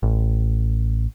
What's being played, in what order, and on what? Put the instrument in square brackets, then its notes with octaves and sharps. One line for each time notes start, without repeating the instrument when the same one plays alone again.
[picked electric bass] A1